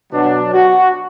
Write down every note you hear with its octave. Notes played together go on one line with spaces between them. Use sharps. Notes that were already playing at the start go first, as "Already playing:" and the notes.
B2 F#3 D4
F#4